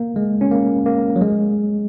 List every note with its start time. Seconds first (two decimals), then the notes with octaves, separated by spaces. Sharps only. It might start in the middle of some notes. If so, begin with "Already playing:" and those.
Already playing: A#3
0.16 G#3
0.41 C#4
0.51 A#3
0.86 A#3
1.16 F#3
1.21 G#3